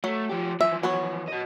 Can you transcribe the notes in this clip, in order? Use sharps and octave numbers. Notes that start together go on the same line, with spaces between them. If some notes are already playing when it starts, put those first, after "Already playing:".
F#3 A3
F3 G4
E3 F3 E5
F#3 B3 C#5
F#4 D#5